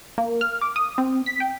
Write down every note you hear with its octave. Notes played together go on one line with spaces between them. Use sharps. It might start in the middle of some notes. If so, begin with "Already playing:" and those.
A#3
F6
D6
D#6
C4
B6
G5